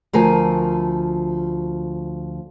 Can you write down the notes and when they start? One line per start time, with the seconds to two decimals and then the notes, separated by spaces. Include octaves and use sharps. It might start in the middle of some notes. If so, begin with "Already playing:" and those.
0.13 D2 F3 A#4 G#5